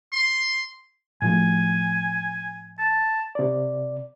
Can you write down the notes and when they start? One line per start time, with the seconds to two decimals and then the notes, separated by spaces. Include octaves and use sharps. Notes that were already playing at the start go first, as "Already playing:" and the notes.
0.13 C6
1.22 A2 F3 A3 G#5
2.79 A5
3.35 C3 D5